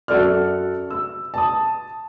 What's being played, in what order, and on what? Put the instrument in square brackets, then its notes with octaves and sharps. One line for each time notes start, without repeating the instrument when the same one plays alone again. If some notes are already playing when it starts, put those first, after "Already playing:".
[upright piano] F#2 F#4 A4 D5 F6
E6
A5 D#6